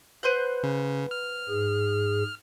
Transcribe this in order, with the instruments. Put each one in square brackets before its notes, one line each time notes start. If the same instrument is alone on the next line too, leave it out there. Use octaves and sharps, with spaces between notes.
[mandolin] B4 C5 F#5
[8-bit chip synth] C#3
F6
[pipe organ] G#2 G#4